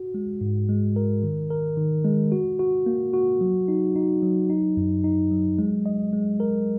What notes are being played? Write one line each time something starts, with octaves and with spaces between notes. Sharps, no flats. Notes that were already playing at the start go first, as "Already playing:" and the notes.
Already playing: F#4
G#3
G#2
G#3
A#4
D#3
A#4
D#3
G#3
F#4
F#4
A#3
F#4
F#3
D#4
D#4
F#3
D#4
F#2
D#4
F#3
G#3
D#5
G#3
A#4